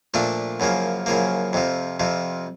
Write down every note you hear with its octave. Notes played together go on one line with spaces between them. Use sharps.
A#2 F3 A3 D4 F4
F#2 C#3 F3 A#3
F#2 C#3 F3 A#3
F2 C3 F3
F2 C3 F3